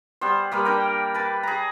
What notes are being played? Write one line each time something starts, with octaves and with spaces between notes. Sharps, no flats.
G3 B3 C5
G3 A#3 B4
D4 A#4 G5
B4 A5
G#4 A#5